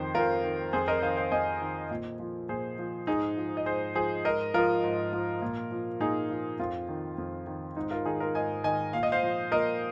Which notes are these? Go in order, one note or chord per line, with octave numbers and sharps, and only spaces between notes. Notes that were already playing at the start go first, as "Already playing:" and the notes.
Already playing: F2 D#3 C5
F2 F4 A#4
D#3
F2 G#4 C5
A#4 D#5
D#3 C5 F5
C5 F5
F2 D#5 G#5
D#3
A#2
F3
A#2 G#4 C5
F3
G#2 D#4 G#4
F3
D#5
G#2 G#4 C5
F3 G#4 C5
G#2 A#4 D#5
F3 F4 A#4
G#2
F3
A#2
F3
A#2 D#4 G#4
F3
F2 F4
D#3
F2
D#3
G#2 D#4
F4 A#4
D#3 D#4 G#4
F4 A#4
G#2 D#5 G#5
D#3 D#5 G#5
A#2 F5
D#5
C5 F5
F3
A#2 A#4 D#5